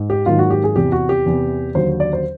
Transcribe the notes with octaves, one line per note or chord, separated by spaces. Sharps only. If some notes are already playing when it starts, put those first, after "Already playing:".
Already playing: G#2
G4
G#2 D#3 F#3 A#3 F4
F#4
G4
G#4
E2 C3 E3 G4
F#4
G4
E2 C3 E3
D#2 D3 F#3 C5
D5
C5